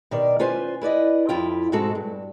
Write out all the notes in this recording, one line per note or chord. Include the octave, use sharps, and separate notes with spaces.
B2 D#3 D5
C#4 F4 B4 C5 G#5
E4 B4 D5 D#5
F2 E4 F4 G5
G#2 B2 G#3 C4 F#4 A4
G2